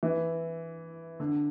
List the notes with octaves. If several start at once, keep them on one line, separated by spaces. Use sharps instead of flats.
E3
D3